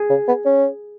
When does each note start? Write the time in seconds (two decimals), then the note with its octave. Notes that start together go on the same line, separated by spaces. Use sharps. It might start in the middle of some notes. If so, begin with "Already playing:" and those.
Already playing: G#4
0.10 C#3
0.28 B3
0.45 C#4